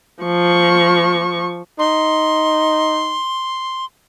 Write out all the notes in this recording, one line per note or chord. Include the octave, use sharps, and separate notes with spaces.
F3 C#6
D#4 C6